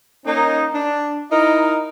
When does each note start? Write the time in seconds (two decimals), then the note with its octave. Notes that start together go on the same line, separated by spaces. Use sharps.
0.25 A#3 C#4 D#4
0.73 D4
1.30 D#4 E4 A#4 D#5